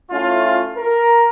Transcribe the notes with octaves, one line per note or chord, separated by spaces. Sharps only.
A3 C#4 E4 F4
A#4